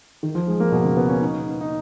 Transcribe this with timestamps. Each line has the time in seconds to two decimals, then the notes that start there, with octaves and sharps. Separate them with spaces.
0.23 D#3
0.35 F3
0.48 G#3
0.60 A#3
0.72 B2
0.84 C#3
0.97 B3
1.09 C#4
1.21 D#4
1.61 D#4